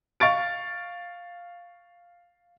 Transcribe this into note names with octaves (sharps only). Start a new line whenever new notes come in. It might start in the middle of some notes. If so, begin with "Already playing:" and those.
F5 C#6 A6 D7